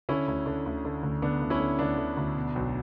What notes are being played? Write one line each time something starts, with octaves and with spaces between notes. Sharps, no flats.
D3 C#4 E4
D2
D3
D2
D3
D2
D3 B3 D4
D2
C#4 E4
D3
D2 B3 D4
D3
D2
B2
B1